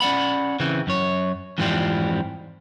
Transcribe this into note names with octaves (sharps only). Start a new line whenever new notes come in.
C#4 D5 F#5 B5
C#3 E3 C4
F#2 C#5
F2 G#2 E3 F3 G3 C4